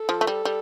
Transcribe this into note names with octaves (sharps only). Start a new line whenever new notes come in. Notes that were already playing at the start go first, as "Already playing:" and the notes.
Already playing: A4
F3
A3
G3
G3